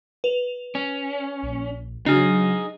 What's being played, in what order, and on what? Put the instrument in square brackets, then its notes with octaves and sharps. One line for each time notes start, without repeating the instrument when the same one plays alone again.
[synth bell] B4 F7
[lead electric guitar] C#4
[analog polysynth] A#1
[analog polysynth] C#3 F#3 [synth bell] D4 F6 [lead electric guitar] D#4 G#4